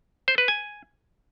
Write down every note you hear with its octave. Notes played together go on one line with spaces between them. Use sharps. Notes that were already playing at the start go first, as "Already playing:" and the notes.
C5
B4
G#5